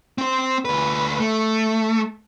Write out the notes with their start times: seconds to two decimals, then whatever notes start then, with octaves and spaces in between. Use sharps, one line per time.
0.18 C4 C5
0.65 D2 B4
1.20 A3